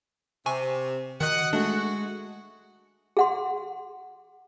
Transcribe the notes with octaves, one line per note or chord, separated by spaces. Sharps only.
C3 G#5 C#6
D#3 F#4 D#5 F#5
G#3 A3 D4 F#4
G#4 F#5 C6